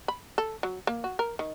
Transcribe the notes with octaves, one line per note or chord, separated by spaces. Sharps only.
B5
A4
F#3
A#3
F#4
A#4
D#3